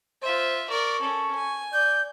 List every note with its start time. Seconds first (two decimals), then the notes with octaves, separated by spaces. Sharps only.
0.23 F4 C5 E5
0.69 A#4 D5 C#6
1.01 C#4 A4
1.35 G#5
1.73 D5 G6